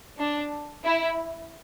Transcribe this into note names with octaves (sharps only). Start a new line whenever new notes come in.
D4
E4